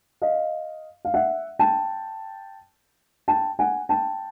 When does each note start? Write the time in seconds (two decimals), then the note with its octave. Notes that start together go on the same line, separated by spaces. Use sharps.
0.22 D#5 F5
1.05 F5
1.14 E5 F#5
1.59 G5 A5
3.28 G5 A5
3.59 F#5 G#5
3.89 G5 A5